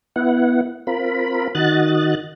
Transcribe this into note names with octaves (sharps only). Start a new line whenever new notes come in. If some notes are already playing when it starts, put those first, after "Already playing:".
B3 E4 F#5
C4 F4 A#4 B5
D#3 F#4 D#5 F#6 A6